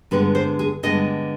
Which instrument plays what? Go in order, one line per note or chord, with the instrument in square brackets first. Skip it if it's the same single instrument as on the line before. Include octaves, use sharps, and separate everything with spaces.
[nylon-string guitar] G2 D3 G#3 B3 B4
C5
G#4
G2 D3 G#3 B3 D#5